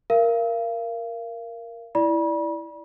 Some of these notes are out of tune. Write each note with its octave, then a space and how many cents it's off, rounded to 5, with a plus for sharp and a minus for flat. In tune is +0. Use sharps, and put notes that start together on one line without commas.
A#4 +0 F5 -35
E4 +0 D5 +0 B5 -40